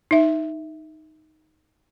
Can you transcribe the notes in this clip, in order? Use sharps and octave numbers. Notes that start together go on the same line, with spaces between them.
D#4 E5